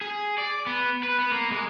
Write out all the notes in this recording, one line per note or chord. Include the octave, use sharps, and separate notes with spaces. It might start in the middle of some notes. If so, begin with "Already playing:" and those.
G#4
D5
B3
B4
B3
A#3
G#3